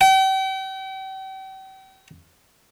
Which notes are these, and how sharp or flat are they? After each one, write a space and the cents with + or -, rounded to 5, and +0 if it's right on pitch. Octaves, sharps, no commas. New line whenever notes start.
G5 -40